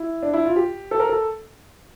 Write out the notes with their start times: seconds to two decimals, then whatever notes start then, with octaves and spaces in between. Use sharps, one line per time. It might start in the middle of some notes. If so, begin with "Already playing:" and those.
Already playing: E4
0.22 D4
0.33 E4
0.45 F4
0.56 G4
0.91 A4
1.00 A#4
1.09 A4